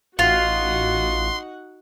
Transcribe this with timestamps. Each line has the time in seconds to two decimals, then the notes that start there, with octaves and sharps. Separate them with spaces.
0.19 A1 D#4 F4 F#4 F#5 C6